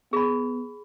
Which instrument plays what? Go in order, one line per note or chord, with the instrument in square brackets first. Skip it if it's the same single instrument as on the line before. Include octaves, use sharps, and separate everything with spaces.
[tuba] B3 [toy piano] G#4 B5